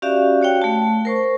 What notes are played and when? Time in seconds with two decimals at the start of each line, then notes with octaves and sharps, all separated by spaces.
0.02 C#4 F#4 G4 D5 E5 F5
0.42 F#4 C#5 F5 G5
0.62 A3 A5
1.05 A#4 C5 C#6